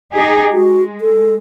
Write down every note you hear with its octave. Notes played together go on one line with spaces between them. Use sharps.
D#4 G4 G#4
G#3 F#4
A4